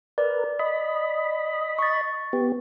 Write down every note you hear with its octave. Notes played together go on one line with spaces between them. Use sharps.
A#4 B4 D5
D#5 B5
C#6 A6
B3 G4